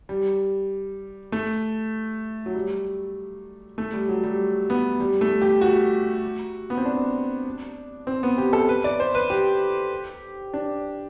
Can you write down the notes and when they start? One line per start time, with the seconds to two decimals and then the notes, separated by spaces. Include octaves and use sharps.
0.09 G3
1.32 A3
2.46 F#3
2.54 G3
3.78 A3
3.93 G3
4.09 F#3
4.24 G3
4.70 B3
5.00 G3
5.21 A3
5.42 G4
5.61 F#4
6.70 B3
6.77 C4
6.85 D4
8.07 C4
8.23 B3
8.38 G4
8.53 A4
8.69 B4
8.84 D5
9.00 C5
9.15 B4
9.30 G4
10.54 D4